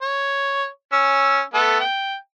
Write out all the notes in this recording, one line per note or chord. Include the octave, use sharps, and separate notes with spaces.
C#5
C#4 E6
A3 B3 A4
G5